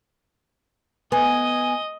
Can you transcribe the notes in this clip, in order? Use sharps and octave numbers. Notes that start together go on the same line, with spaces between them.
B3 D#5 G#5